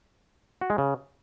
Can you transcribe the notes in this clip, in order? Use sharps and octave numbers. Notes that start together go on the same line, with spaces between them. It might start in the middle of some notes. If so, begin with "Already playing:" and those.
F#4
G#3
C#3